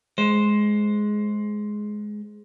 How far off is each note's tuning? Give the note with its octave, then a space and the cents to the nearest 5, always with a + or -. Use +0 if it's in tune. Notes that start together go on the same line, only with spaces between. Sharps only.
G#3 +10 C5 +0